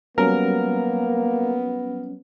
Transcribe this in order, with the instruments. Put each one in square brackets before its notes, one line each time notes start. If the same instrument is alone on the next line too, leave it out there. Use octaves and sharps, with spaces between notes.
[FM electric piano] F#3 G3 C#4 [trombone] A#3 [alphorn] B3 [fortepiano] A#4